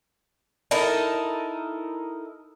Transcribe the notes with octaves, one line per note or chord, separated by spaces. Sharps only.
D#4 E4 A4 A#4